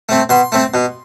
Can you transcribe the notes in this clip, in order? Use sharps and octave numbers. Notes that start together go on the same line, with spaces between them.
A3 C4
B2 C6
A3 C4
B2